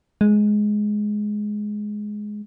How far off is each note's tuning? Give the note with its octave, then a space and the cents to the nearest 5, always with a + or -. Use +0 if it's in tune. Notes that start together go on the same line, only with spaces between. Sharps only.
G#3 +10